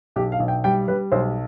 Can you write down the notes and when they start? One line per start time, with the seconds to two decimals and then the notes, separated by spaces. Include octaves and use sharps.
0.16 B1 G4
0.32 F5
0.40 B1
0.48 G5
0.64 G3 G5
0.88 G3 B4
1.12 B1 C5